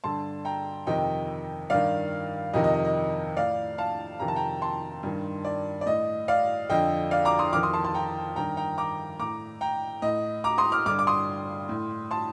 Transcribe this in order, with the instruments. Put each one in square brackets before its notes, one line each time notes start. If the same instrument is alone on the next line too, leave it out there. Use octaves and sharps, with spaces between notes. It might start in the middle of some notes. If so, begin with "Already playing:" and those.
[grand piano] G2 D3 A5 C6
G5 A#5
F2 C3 D#3 D#5 G5
G2 D#3 D5 F5
F2 C3 D#3 D#5
D#5
D#5
D#5
A2 D5 F5
F5 A5
F2 C3 D#3 A#5
A5
G5 A#5
A5 C6
G2 D#3
D5
D5
A2 D#5
D5 F5
F2 D3 D#5 G5
D5 F5
A#5 D6
C6 D#6
F2 D#3 D6 F6
C6 D#6
A5 C6
A5 C6
G5 A#5
G2 D#3 G5 A#5
G5 A#5
A#5 D6
A2 A#5 D6
G5 A#5
A2 D#5
A#5 D6
C6 D#6
D6 F6
G2 D3 D6 F6
D6
C6 D#6
A2
A5 C6